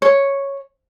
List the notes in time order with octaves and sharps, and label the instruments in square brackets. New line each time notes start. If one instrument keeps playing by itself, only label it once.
[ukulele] C#5